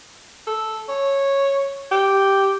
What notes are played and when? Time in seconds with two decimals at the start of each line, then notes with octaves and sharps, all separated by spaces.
0.47 A4
0.89 C#5
1.91 G4